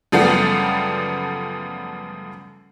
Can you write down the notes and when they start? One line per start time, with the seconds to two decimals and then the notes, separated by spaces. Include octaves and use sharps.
0.12 F#2 C#3 F3 G3 A3 B3